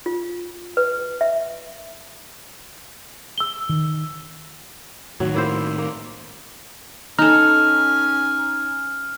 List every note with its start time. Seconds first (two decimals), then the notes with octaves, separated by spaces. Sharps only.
0.06 F4
0.77 B4
1.21 E5
3.38 E6 G7
3.69 D#3
5.20 A2 D#3 F#3
5.34 A#3 E4 C5
5.78 A#3
7.19 C#4 D#4 A4 G#5 A#5 F6